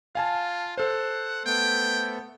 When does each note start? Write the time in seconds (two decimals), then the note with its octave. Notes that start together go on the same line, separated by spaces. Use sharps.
0.15 F4 F5 G#5 A5
0.78 A4 C5 F#5
1.46 A3 B3 G5